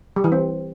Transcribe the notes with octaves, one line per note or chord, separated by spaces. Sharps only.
G3
E3
C4